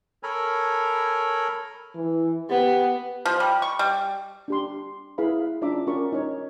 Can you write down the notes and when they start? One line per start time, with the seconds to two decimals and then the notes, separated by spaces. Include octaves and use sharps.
0.23 A4 A#4 C#5 G#5 A#5 B5
1.95 E3
2.50 B3 G4
3.25 F3
3.40 G3
3.62 C#6
3.79 G3
4.48 D4 G4 C6
5.18 E4 G#4 B4 F5 B5
5.62 C#4 D4 F4 E5 A#5 D6
5.87 C#4 F#4 A#4 D5 C#6
6.12 D#4 C#5